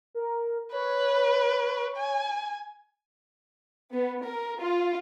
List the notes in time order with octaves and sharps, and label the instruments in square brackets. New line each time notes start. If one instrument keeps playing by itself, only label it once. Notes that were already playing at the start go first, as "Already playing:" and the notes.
[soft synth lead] A#4
[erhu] B4 [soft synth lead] C#5
[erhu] G#5
[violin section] B3
A#4
F4